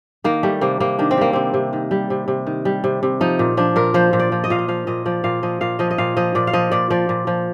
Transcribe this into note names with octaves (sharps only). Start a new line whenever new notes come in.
D#3 A#3
G3 A3
C3 A#3
C3 A#3
D#3 D4
C4
G3 A#3
C3 C4
C3
D#3
G3
C3
C3
D#3
G3
C3
C3
F3 D#4
A#2
F3 D4
A#2 A#4
F3 C5
A#2
D5
F3
D#5
A#2 F5
D#5
F3 F5
A#2 D#5
F3 D5
A#2 F5
F3 D#5
A#2 F5
F3 D#5
D#5
A#2 F5
F3 D#5
A#2 D5
F5
F3 D#5
A#2 D5
F3 D5
A#2
F3